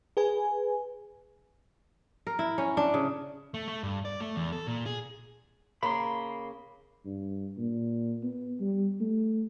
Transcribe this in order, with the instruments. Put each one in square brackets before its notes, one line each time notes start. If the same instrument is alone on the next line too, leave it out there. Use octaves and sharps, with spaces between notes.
[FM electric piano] G#4 B4 G#5
[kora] A#4
E4
C#4
D4
C#3
[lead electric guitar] A3
A3
G2
D5
A3
E2
A4
A#2
G#4
[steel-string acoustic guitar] C#3 A#3 [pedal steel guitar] B5 C6
[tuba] G2
A#2
B3
G3
A3